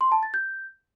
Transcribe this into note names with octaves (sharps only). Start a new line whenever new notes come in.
C6
A5
A6
G6